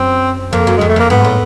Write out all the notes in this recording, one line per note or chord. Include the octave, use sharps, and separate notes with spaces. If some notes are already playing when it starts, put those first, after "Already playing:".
Already playing: F#2 C4
F2 A#3
F#2
F2 G#3
A3
F2 A#3
G#2 B3
A2